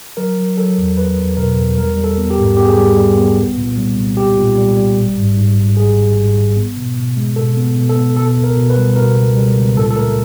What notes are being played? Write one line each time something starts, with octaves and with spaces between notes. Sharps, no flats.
F#3 A#4
F#3
F#3 A4
E2
E2 B4
E2
B2 A#4
E2
G3 A#4
G3
A4
B3
G4
G#2
B3 G4
G#4
G3 G4
G3
B3
C2
A#2
G3
C2
G3 G4
A#2
G3
G3
G#1
G#2
G#2
G#2
G#1 G#4
G#1
G#2
G#1
B3
B2
B2
G#3
B2 A4
B3
B2
A4
B3
B2 A4
C#2
A#4
B2
B4
G3
B2 A#4
C#2
G3
C#2
A#2 A4
A4
A3 A#4